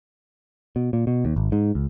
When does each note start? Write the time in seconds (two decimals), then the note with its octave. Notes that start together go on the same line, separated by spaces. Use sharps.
0.76 B2
0.93 A#2
1.07 B2
1.25 D#2
1.36 G#1
1.52 G#2
1.75 C#2